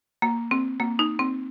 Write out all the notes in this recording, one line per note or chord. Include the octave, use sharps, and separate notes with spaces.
A#3
C4
A#3
D#4
C4